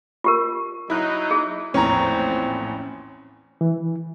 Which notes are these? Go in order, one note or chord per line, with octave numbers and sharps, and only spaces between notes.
F4 G4 A#4
F#3 D#4 E4 F#6
G#4
A#1 E2 A2 C4 C#4 A#5
E3